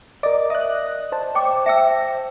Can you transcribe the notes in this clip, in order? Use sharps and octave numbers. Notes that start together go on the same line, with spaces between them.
A#4 D5 D#5 D6
E5 D#6 F#6
C5 A5
C#5 G5 D6
E5 G5 E6